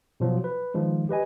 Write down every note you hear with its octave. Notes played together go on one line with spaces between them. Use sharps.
B2 F3 F#3
B4
D#3 F3 G#3
G4 B4 D#5 G#5